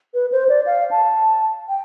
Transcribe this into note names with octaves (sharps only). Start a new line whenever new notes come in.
B4
C5
D5
F5
A5
G5